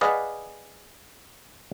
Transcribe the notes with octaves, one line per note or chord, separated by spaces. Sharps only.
G#4 B4 D5 D#5 F5 F#5